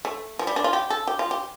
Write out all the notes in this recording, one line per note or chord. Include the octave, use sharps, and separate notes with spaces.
A3
F3
G3
D4
F4
G4
A4
G4
F4
G4